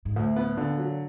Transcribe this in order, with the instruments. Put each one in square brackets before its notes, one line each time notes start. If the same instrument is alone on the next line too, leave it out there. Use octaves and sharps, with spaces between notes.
[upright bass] G#2
[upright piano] D2 [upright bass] A2
[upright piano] B3
[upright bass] A#2 [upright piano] D3
[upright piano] F#3